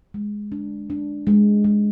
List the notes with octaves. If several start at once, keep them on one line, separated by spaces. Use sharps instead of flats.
G#3
D4
D4
G#3
G#3